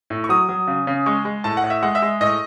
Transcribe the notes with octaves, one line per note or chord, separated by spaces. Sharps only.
A2
C#6
F#3 D#6
F#3
C#3
C#3
G#3 C#6
G#3
A2 A5
F#5
A2
E5
G#3 F#5
E5
G#3
A2 D#5